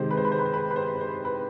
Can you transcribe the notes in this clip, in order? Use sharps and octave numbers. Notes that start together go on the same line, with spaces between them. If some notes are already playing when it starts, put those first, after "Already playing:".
Already playing: C3 D#3 G#3 C5
B4
C5
B4
C5
B4
C5
B4
B4
C5
C5
B4